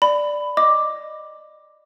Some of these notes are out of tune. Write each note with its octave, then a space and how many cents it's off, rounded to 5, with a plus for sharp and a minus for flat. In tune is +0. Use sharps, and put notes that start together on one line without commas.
D5 +0 B5 +15
D#5 -10 D6 +5